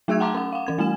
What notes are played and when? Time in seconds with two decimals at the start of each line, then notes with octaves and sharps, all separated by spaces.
0.08 F#3 A3 G#4 E5 E6 G#6
0.20 F#5 G5 A5 A#5 C6 D6
0.34 C#4 F#5
0.52 F5 F#5
0.67 E3 C#4 G#6
0.78 G3 A3 G#5 E7